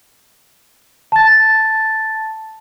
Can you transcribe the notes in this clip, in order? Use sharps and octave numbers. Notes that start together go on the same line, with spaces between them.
A5 A6